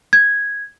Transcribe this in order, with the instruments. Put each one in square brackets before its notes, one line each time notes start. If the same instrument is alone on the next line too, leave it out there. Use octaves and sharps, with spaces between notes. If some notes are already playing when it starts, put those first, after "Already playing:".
[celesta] G#6